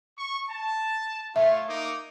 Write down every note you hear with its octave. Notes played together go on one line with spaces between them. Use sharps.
C#6
A5
A3 F4 C#5 E5
A#3 D#4 D6